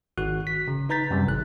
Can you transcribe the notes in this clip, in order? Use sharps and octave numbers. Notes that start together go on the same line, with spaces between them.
G#1 F#4 F#6
B6
C#3
D#4 B4 A#5 G6 A6 B6
F#2 C3 G3
G#1 F#6